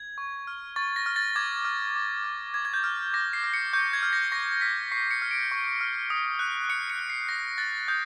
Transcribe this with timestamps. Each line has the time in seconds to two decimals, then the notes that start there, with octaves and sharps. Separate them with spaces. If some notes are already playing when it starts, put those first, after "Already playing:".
Already playing: G#6
0.18 C#6
0.47 F6
0.76 C#6 A6
0.96 A#6
1.06 F6
1.16 A6
1.36 D6 G#6
1.65 F6
1.96 D6
2.24 F6
2.54 D6 G#6
2.65 G#6
2.74 G6
2.84 F6
3.14 D6 A#6
3.33 C7
3.44 F6
3.54 C#7
3.73 C#6 G6
3.93 G#6
4.03 F6
4.13 A#6
4.32 C#6 A#6
4.61 F6 B6
4.92 C#6 C7
5.11 C#7
5.22 F6
5.31 D7
5.51 C#6
5.81 F6
6.10 D#6
6.39 F#6
6.69 D#6 C#7
6.90 C#7
7.00 F#6
7.10 C7
7.29 D#6 A#6
7.58 F#6 A6
7.88 D#6 G6